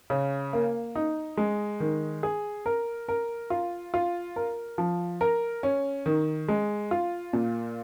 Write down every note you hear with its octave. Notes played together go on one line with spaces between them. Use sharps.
C#3
A#3
D#4
G#3
D#3
G#4
A#4
A#4
F4
F4
A#4
F3
A#4
C#4
D#3
G#3
F4
A#2